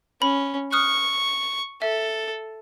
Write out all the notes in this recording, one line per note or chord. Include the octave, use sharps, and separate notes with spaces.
C#4 B5
C#6 D#6 F6 F#6
A4 E5